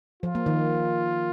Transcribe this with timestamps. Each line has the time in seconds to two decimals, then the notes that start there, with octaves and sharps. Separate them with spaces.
0.23 F3 F4
0.35 A#3
0.46 D#3